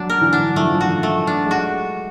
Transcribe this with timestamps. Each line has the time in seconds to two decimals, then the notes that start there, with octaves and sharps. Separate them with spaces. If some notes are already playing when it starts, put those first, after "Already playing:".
Already playing: F#3 D4
0.10 A#4
0.21 D3 E3
0.33 D4
0.56 F#3 A3
0.67 F3
0.77 E3 F#4
0.87 D#3 F3
1.03 A3
1.27 D4
1.45 G#3
1.51 F#4